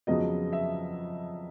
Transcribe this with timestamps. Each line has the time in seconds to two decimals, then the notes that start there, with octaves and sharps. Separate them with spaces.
0.07 F2 C#3 F#3 B3 D#5
0.53 E5